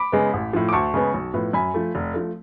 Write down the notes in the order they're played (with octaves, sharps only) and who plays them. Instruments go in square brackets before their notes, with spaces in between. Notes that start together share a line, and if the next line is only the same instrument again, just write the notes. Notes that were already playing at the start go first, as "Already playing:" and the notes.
Already playing: [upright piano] B5 D6
C#3 G#3 B3
A1
A2 F3
D6
D2 A5 C#6
C#3 G#3 B3
B1
A2 F3 B3
F#2 G#5 B5
F3 A3
F1
F3 A3